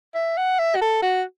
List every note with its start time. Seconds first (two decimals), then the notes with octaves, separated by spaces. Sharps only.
0.15 E5
0.37 F#5
0.59 E5
0.76 F#4
0.81 A4
1.02 F#4